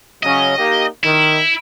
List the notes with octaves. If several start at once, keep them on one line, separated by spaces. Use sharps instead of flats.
C#3 F#3 C#4 D#5
A#3 D#4 G4
D#3 E4